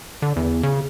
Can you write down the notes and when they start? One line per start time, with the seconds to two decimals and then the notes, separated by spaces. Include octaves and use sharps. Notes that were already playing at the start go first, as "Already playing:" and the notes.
0.22 D3
0.36 E2
0.63 C#3